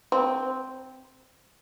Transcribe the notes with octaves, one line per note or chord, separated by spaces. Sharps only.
C4